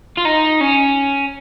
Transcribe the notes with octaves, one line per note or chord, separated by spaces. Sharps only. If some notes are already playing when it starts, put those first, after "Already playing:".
F4
D#4
C#4